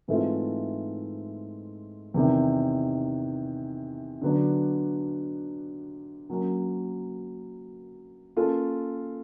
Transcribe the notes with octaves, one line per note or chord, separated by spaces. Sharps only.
G#2 E3 A3 C4 F4
E2 C3 D#3
D3 F#3 B3 D4
F#3 A#3 C#4
A#3 C#4 F4 A4